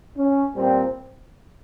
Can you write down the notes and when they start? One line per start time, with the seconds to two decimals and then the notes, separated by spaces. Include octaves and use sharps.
0.18 C#4
0.56 A#2 G3 C4